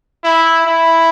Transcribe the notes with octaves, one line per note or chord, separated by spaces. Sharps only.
E4
E4